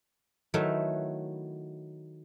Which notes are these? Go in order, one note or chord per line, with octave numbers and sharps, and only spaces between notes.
D#3 F#3 A3 D#4 E4 B4